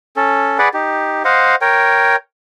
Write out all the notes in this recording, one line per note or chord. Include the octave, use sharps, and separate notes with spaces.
C#4 A4
G#4 B4 D5 F#5
D#4 G4
C5 D#5 F5 F#5
A#4 C#5 G5